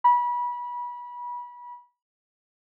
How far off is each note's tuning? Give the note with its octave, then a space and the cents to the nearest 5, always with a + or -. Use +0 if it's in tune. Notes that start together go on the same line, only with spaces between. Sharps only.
B5 -30